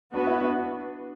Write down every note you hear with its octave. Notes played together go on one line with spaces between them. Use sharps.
B3 D4 F#4 B4
E4
D4